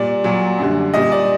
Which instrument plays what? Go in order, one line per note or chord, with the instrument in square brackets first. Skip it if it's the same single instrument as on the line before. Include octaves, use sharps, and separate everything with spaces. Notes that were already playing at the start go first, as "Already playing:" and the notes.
Already playing: [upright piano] A#2 G3 D5
A#2 F#3
F#2 D3 G3
A#2 G3 D#5
D5